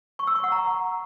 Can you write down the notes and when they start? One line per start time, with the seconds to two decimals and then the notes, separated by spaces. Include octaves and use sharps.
0.19 C#6
0.27 E6
0.35 C#6
0.44 F#5
0.52 A#5